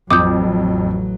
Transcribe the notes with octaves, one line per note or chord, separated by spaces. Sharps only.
A1 F2 F#3 D6 D#6 G6